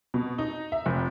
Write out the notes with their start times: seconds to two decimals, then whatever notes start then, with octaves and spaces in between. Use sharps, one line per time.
0.14 B2
0.38 D#4
0.72 E5
0.86 F1